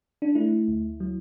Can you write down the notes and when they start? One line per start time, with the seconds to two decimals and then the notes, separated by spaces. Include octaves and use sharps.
0.22 D4
0.35 A3 E4
0.68 D2
1.00 F#3